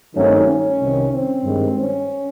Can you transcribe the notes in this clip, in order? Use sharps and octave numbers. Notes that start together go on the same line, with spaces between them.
G2 D#3 F#3 A3 C4 C#4 D#4
C#4
C2 C3 D#3
C4
G2 D#3 G#3
C#4